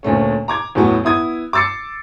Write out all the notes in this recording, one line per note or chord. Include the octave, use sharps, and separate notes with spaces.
D2 A#2 A3 C#4
A#5 D6 G#6
E2 A2 F#3 B3
B3 E4 D#6 G#6
D6 E6 A6 C7 C#7